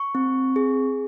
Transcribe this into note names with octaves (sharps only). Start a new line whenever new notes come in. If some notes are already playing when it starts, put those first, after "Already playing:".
Already playing: C#6
C4
G#4